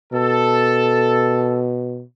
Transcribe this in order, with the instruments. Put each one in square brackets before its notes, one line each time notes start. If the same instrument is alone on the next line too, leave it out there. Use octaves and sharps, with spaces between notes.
[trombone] B2 [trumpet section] A4